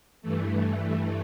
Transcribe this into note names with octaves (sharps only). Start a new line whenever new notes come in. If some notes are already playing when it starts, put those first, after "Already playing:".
G2 E3 A3